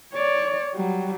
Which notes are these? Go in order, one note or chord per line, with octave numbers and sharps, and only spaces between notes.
C#5 D5
F#3 G3